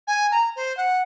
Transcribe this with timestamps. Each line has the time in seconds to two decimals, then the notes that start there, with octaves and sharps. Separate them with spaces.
0.07 G#5
0.31 A#5
0.56 C5
0.77 F#5